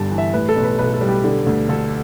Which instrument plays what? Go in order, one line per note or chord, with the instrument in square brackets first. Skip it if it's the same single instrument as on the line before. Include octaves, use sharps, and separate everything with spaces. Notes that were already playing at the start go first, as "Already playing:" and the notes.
Already playing: [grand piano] G1 G2 G3 A5
E3
E5
A2 B4
A4
B1
B4
B1 B4
A4
G3
G4
D3
D2
D2 A4